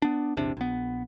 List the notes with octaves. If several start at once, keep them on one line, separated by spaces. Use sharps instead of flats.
B3 D4
A#1 E2 C3 D4
A#1 B3